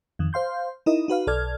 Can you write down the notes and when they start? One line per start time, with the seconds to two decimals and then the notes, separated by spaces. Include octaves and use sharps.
0.19 F2 D#3
0.33 C5 F5 C6 G6
0.86 D#4 E4 A#4 D#5
1.08 D#4 F#4 B4 F5
1.27 B1 A4 D5 F6 G#6